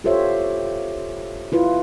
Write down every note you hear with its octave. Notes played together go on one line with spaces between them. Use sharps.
F4 G4 A4 C5 C#5 E5
E4 F4 B4